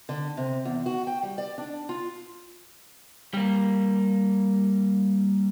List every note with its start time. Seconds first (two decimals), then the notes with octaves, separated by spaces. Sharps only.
0.09 D3
0.37 C3
0.65 E2
0.86 F#4
1.07 G5
1.23 G3
1.38 D5
1.58 D4
1.89 F4
3.34 G3 A#3